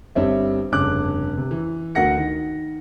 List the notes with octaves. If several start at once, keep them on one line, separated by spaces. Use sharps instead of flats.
G1 G3 C4 C#5 E5
F1 G2 C#3 C#4 D6 F#6
C3
E3
D2 F#4 A#4 F#5 A#6 C#7
D#3